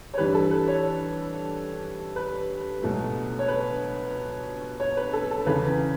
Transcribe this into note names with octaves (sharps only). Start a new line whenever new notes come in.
C#5
G2 E3 G3 B4
A4
B4
C#5
B4
C#2 B2 F#3 A3
C#5
B4
C#5
B4
A4
A4
E2 C#3 E3 B4